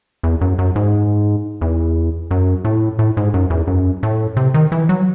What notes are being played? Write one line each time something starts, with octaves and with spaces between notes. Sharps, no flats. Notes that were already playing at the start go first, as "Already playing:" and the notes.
E2
F#2
F#2
G#2
E2
F#2
A2
A2
G#2
F#2
E2
F#2
A2
C3
D#3
E3
F#3